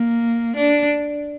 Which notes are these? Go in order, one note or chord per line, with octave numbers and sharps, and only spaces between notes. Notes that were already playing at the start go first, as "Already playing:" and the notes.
Already playing: A#3
D4